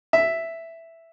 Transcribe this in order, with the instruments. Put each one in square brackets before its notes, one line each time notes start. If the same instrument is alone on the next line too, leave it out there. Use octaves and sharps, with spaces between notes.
[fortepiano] E5